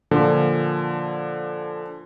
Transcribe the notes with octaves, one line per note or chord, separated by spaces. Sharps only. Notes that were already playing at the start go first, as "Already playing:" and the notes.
A#2 D3 F3